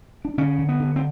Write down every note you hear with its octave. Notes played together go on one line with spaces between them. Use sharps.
D4
D3 C#4
D3
B3
D3
C4